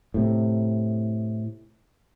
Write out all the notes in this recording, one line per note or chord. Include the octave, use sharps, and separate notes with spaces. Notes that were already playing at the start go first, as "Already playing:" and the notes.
A2 C3